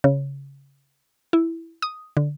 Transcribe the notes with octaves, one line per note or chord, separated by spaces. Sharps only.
C#3
E4
D#6
D3